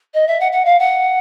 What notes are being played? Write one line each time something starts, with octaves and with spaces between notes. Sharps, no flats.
D#5
E5
F#5
F#5
F5
F#5